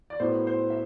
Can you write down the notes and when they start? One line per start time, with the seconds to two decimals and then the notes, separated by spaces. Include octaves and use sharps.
0.10 D5
0.20 A2 F#3 B3 E4 C5
0.47 C5
0.70 E5